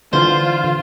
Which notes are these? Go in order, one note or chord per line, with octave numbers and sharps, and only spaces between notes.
D3 E3 F4 C5